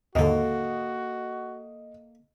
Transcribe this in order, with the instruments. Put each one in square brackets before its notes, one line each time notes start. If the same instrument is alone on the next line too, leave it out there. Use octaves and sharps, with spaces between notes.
[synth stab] D#2 G#2 D3 [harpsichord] A#3 A4 [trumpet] F#4 [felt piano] D#5